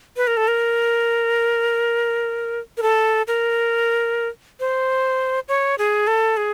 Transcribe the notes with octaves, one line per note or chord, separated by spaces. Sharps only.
B4
A#4
A4
A#4
A#4
A4
A#4
C5
C#5
G#4
A4
G#4